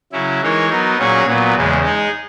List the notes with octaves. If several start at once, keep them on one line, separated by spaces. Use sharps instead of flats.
C#3 F#3 C#4 E4
E3 G#3 D#4 A#4 C#5
F#3 B3 D#4 A#4
A#2 F#3 C#4 G#4 C#5
A#2 F#3 B3
E2 C#3 G#3
G#3 D#4 G#4